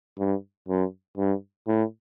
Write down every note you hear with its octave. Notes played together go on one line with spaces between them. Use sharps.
G2
F#2
G2
A2